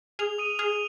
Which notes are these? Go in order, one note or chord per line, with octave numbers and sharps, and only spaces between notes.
G#4 F6 F7
D#6 D#7
G#4 F6 F7